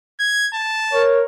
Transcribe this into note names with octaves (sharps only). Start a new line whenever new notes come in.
G#6
A5
A#4 C#5